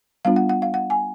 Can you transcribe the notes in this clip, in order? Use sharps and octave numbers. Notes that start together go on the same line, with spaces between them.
G3 B3 D4 F4 F5
F#5
F#5
F5
F#5
G#5